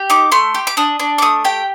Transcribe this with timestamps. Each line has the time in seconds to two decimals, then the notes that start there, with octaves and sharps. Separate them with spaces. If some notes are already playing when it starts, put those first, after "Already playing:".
Already playing: G4
0.10 D#4 D6
0.32 A3 C6
0.55 G4
0.67 D6
0.77 D4 D#6
0.99 D4
1.18 D6
1.22 A3 D#6
1.45 G4 G5